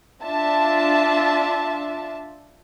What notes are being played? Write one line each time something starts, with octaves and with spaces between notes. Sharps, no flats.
D4 F4 E5 A5